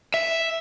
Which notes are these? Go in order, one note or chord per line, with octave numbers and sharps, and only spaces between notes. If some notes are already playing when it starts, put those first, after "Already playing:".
E5